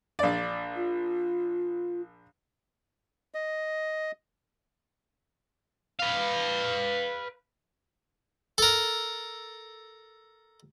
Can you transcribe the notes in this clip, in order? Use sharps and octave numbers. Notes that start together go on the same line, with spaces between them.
A#1 D5
F4
D#5
B4 F5
A4 A#4